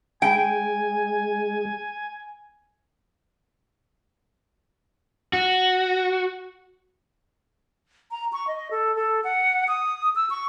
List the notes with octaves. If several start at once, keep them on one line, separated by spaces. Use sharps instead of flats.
G#3 G5 G#5
F#4
A#5
C#6
D#5
A4
A4
F#5
D#6
E6
C#6